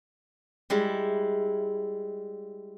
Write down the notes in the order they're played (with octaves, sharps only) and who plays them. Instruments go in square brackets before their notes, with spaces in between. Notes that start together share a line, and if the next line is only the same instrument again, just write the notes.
[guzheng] G3 G#3 E4